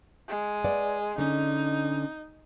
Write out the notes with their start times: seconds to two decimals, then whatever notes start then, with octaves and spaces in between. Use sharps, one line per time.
0.28 G#3
0.64 B4 D5 F#5
1.18 D3 C#4 D#4